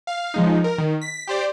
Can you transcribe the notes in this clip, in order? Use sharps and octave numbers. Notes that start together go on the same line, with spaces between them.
F5
F3 G#3 D#4
A#4
D#3
B6
G4 C5 D5